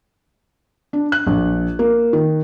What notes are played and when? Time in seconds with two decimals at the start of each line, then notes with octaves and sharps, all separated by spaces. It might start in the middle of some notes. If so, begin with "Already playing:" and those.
0.93 D4
1.12 F#6
1.27 A#1
1.79 A#3
2.13 D#3